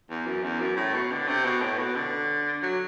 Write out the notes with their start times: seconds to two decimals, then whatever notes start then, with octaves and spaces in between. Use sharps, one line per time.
0.10 E2
0.26 F#2
0.43 E2
0.61 F#2
0.77 A2
0.94 B2
1.11 D3
1.28 C3
1.45 B2
1.62 A2
1.78 B2
1.96 D3
2.63 F#3